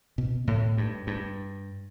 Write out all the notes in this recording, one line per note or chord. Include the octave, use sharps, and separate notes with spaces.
B2
A2
G2
G2